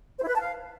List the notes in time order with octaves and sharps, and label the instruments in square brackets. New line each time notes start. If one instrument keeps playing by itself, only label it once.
[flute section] C5
E4
B4
A5
F5